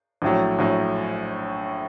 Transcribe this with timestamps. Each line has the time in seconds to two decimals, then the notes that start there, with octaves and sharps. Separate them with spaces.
0.22 A#1 A2 F#3
0.59 A#1 A2 F#3